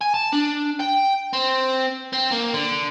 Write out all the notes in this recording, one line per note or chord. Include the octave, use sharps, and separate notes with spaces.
G#5
A5
D4
G5
C4
C4
A#3
D3